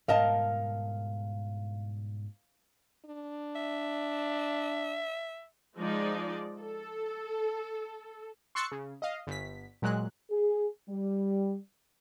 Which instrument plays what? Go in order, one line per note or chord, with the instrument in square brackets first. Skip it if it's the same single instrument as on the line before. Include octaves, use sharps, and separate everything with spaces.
[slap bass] G#2 B2 G3 [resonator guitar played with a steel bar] A#4 D#5 A5 [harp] F5
[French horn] D4
[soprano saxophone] E5
[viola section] F3 G#3 D#4 D5
A4
[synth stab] C6 C#6 E6 F#6 A6 C#7
C#3
D#5 F5
G1 B6
A#2 F#3 G#3 F#6
[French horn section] G#4
G3